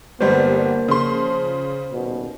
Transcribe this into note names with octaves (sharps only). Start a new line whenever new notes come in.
G1 G3 A#3 B3 C5
C#3 F3 C6
D#1 B2